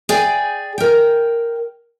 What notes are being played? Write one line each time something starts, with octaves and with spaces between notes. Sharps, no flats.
G#4 D5 G5 G#5
A#4 G5